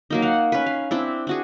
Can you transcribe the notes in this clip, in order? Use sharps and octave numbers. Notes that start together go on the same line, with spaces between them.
F#3 A#3 D#4
F5 F#5
C#4 B4
F5
C4 D4 E4
D4 F#4 G#4